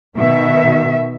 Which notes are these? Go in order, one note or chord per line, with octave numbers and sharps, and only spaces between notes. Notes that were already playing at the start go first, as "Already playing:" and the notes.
B2 D#3 E5